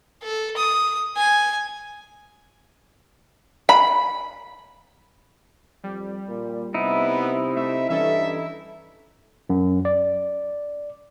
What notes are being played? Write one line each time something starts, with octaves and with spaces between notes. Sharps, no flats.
A4
D#6
G#5
B5
F2 G3
A#2
C3 B3 D#4 E4
A3 E5
G2 E3 C#4 A4 E5
F#2
D5